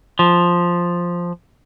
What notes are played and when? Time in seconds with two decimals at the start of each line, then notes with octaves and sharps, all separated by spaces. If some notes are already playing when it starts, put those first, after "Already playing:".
0.19 F3